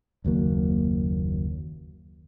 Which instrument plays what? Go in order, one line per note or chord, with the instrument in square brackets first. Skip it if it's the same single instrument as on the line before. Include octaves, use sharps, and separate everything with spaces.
[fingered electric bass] F#1 D#2 F#3 A#3